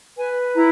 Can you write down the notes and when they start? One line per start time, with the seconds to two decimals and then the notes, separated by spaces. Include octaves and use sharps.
0.16 B4 G#5
0.55 E4 A#5